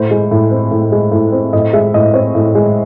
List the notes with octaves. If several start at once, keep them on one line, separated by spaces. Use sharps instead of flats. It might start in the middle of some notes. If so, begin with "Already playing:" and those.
Already playing: A2 C5
G#3
A2
C4
A2
G#3
A2
C4
A2 D#5
G#3 E5
A2 D#5
C4 C#5
A2
G#3